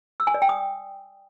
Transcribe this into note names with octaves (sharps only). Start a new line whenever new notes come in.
E6
G#5
D5
G5
D#6